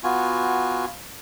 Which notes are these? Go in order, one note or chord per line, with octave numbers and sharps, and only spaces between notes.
B3 F4 F#4 G#5